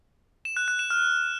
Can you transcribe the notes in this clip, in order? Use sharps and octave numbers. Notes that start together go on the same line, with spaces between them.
E7
F#6
F#6
E7
F6